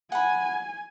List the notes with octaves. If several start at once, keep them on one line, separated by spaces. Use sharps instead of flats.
F#5 G#5 B5